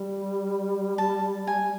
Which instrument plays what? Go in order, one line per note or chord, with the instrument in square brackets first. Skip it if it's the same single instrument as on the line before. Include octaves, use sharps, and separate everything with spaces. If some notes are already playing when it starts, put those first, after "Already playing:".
Already playing: [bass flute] G3
[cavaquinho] A5
G#5